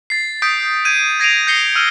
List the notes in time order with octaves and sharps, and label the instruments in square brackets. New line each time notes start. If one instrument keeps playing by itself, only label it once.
[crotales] A6 C7
D#6 G6 B6 D7
G6 G#6 D#7
G#6 A#6 C7 D7 D#7 F7
G6 A#6 C7 C#7 G7
E6 F6 D#7 G7